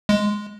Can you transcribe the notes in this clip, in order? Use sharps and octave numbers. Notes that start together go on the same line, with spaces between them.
G#3